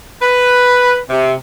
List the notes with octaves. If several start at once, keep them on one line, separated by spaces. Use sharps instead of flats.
B4
C3